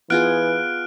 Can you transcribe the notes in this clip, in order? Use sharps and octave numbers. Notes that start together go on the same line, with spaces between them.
E3 B3 F4 G#4 F6 F#6 D7